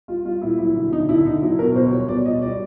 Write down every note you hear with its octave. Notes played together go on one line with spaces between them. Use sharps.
G3 F4
G3 F4
A#2 E4
F#3 E4
D3 E4
D3 D#4
D3 E4
D3 D#4
F#3 E4
B2 A#4
B2 C5
G3 C#5
B2 D5
B2 D#5
G3 D5